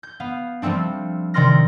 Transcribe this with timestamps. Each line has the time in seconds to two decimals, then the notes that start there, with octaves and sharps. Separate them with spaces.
0.03 G6
0.20 B3 F5
0.62 F3 G3 A3 C4 D4
1.34 C3 D#3 D5 C6 F6 A#6